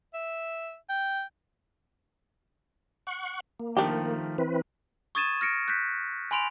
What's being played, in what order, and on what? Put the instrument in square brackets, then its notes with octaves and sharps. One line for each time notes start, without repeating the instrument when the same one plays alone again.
[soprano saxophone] E5
G5
[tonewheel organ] F#5 C#6
A#3
[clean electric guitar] D#3 F3 A3 [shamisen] D4 G4
[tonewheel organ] E3 C4 B4
[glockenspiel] C#6 D#6 G#6 A6 D#7 E7
F6 A#6 C#7 D7
F#6 G6 B6
G#5 B5 C6 D7 F7